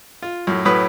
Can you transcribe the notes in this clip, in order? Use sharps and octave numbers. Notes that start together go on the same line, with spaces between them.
F4
F#2 A2
F#2 A2 F#3 B4 D#6